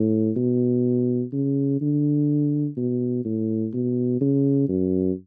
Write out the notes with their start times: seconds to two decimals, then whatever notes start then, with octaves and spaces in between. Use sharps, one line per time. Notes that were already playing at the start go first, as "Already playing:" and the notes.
Already playing: A2
0.36 B2
1.33 C#3
1.81 D3
2.77 B2
3.25 A2
3.73 B2
4.20 C#3
4.68 F#2